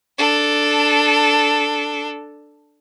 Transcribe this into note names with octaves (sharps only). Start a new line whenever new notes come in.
D4 A4